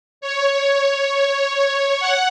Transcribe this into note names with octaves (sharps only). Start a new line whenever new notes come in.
C#5
F#5